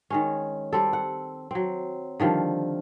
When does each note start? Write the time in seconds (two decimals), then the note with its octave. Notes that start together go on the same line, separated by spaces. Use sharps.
0.10 D#3 G#3 C#4
0.73 G3 C4 A4
0.93 F#5
1.51 F#3 C4
2.20 D3 D#3 F3 G3